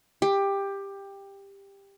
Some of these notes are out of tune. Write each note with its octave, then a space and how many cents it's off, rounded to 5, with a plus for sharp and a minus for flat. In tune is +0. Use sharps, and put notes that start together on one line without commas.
G4 +15